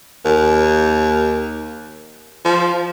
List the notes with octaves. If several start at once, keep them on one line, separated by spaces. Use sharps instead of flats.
D#2
F3